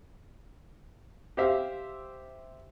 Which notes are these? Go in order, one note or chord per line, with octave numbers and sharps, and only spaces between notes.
G4 C5 E5 F5